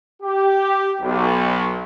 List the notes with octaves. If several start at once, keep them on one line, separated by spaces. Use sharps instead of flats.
G4
B1